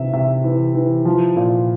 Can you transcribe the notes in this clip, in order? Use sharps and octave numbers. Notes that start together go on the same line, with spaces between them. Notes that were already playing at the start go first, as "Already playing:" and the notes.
Already playing: C3 E3 E5
C3 E5
E3
E3
F3
A#2